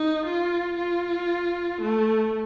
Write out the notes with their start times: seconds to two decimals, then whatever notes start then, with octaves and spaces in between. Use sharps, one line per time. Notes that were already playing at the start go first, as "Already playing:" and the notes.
Already playing: D#4
0.26 F4
0.77 F4
1.82 A3